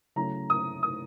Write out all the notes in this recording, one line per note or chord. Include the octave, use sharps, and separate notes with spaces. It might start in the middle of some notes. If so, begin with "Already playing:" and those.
C#3 F#3 A3 C#4 E4 A#5
D#6
D#6